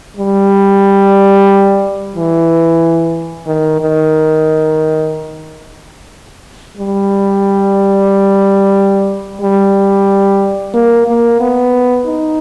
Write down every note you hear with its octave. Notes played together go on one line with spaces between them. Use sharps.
G3
E3
D#3
D#3
G3
G3
A#3
A#3
B3
D#4